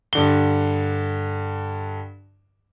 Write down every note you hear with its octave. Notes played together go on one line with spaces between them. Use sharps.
G2 D3 G7